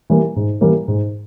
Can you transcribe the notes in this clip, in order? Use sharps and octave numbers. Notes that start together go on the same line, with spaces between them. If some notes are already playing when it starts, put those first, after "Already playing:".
E3 G3 A#3
G#2
E3 G3 A#3
G#2